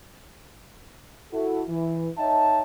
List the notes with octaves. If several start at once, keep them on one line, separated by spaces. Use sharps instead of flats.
E4 F#4 A4
E3
D#4 C#5 D#5 E5 G5 A5